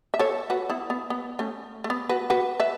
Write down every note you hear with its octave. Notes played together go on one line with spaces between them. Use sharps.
E5
A4 C#5
F#4 B4
B3 E4
B3
B3
A3 C#4
A3
B3
F#4 B4
F#4 B4
B4 E5